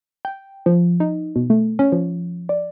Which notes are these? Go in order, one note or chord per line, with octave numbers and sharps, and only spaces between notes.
G5
F3
D#4
B2
A3
C#4
F3
D5